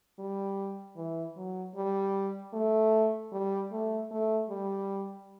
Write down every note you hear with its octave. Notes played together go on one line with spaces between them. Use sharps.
G3
E3
F#3
G3
A3
G3
A3
A3
G3